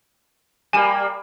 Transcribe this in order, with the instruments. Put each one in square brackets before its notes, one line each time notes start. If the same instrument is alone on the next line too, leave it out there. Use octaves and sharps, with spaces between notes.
[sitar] G3 A#3 [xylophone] G#5 E7